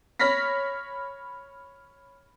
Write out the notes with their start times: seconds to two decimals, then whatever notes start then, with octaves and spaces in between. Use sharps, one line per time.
0.19 C#5 B5 F6 A#6 B6